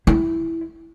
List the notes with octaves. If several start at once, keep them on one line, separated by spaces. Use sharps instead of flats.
E4